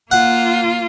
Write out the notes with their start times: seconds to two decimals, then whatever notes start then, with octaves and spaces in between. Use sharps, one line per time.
0.11 A#3 F4 F#5